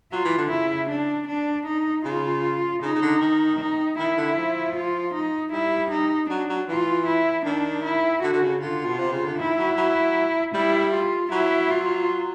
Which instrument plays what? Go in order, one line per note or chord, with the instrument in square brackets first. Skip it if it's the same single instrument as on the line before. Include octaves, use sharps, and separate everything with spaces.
[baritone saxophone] F#3 [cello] F4
[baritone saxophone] E3
D3
[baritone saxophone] C#3 [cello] E4
[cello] D4
D4
D#4
[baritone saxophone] C#3 [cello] F4
[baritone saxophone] C#3 [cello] D#4
[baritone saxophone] C#3
D3
D#3
[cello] D#4
[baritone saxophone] D#3 [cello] E4
[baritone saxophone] D3
F3
[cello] F4
D#4
[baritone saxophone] G3 [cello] E4
[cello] D#4
[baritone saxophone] F#3 [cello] D4
[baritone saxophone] F#3
[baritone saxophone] E3 [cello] F4
[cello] E4
[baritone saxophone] D#3 [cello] D4
[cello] E4
[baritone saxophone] D3 [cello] F#4
[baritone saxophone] D3
C#3
[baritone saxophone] D3 [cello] F4
[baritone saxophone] B2
C3
C#3
D3
[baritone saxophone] D#3 [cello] E4
[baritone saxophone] F#3
F#3
[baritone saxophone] G3 [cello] E4
[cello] F4
[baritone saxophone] F#3 [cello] E4
[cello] F4